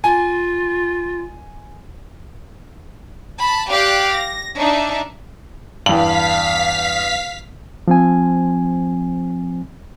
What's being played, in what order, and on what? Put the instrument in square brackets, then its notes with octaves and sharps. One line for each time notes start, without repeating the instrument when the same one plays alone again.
[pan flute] F4 [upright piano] G#5
[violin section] A5 B5
G4 D5 F5 F#6
A#6
D4 D#4 E5
[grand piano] E2 F#7 [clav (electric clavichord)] G2 [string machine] F5 B6
[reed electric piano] F3 C4 G#5